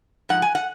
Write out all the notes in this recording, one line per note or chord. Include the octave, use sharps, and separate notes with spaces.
G#2 F3 F#5
G#5
F#5